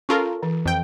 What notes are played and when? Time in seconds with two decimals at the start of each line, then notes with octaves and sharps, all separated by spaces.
0.09 C#4 F4 A4 A#4 A5 C#6
0.43 E3
0.65 F2 G5